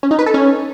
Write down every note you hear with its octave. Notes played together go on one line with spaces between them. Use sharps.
C#4
D#4
B4
A4
C#4